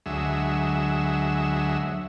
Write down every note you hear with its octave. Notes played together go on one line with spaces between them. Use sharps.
D2 F#3 G#3 E5